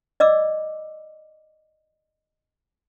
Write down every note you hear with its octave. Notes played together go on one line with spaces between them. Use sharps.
D5 D#5 D6 E6